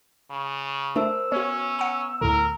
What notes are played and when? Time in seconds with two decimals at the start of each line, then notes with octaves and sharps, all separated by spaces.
0.30 C#3
0.96 A3 D4 A#4 C5 E6
1.32 B3 C#4 F#4 C#5
1.79 F#5 A#5
2.21 D2 A2 D3 A#4